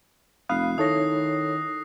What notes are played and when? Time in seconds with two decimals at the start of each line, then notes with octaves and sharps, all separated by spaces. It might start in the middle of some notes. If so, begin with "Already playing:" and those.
0.49 F1 F5 B5 D#6 F#6 C7
0.78 D#3 E4 A4 C#5 D#6 A#6